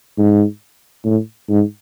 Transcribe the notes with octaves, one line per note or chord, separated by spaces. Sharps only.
G#2
A2
G#2